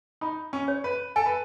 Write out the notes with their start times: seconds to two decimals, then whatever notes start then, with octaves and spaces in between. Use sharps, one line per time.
0.21 D#4 B5
0.53 C#4
0.68 C#5
0.84 B4
1.16 A4 G#5
1.26 B4